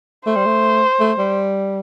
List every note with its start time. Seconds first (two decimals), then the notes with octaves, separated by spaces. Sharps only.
0.27 A3 C5
0.36 G3
0.46 A3
1.00 A3
1.18 G3